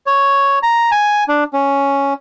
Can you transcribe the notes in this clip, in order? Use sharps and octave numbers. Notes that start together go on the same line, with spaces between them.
C#5
A#5
G#5
D4
C#4